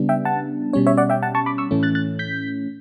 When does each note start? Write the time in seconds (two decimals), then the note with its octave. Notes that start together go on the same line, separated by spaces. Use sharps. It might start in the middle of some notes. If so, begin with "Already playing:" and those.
Already playing: C#3 G3 B3 D4
0.09 E5 G5
0.25 F#5 A5
0.73 B2 G3 C#4 C#5
0.87 C#5 E5
0.97 D5 F#5
1.10 E5 G5
1.22 F#5 A5
1.35 A5 C#6
1.46 B5 D6
1.58 C#6 E6
1.71 A2 E3 A3 C#4
1.83 F#6 A6
1.95 F#6 A6
2.19 G6 B6